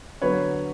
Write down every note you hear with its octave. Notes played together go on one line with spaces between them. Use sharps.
D3 F#3 B3 B4 C#5